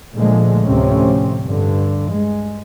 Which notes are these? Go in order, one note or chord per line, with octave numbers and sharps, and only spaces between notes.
A#2 D3 F3 G#3 A3
D2 A2 C3 F3 C4 C#4
G2 D3
G#3